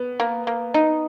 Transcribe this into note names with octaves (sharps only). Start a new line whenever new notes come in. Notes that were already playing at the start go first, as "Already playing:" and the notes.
Already playing: B3
A#3
A#3
D#4